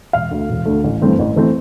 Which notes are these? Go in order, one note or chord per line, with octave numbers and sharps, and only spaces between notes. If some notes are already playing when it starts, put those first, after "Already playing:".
E1 F5
D2 D3 A3
E1
D2 D3 A3
A1
G2 E3 A3 C4
A1
E3 A3 C4